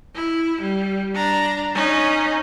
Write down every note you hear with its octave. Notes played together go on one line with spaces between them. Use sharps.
E4
G3
D4 A#5
C#4 D#4